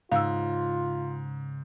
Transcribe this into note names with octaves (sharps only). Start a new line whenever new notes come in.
G#2 C#3 F4 F5 E6